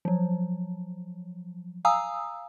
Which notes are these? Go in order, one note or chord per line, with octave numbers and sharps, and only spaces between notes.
F3 F#3
F5 G#5 A#5 D#6 E6